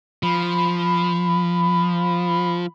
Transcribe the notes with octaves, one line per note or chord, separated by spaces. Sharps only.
F3 B5